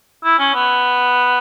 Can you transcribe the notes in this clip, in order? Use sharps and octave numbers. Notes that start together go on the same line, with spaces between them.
E4
C#4
B3